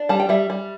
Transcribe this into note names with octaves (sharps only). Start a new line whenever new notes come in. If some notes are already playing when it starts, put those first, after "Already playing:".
Already playing: D4
G3 A5
G5
G3 E5
G3